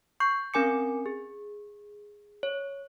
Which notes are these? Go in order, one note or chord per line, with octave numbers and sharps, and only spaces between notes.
C#6 G6 C7
C4 C#4 A#4 G#5 D6 C#7
G#4
C#5